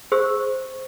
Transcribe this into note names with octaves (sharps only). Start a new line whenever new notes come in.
G#4 C5 C#6 E6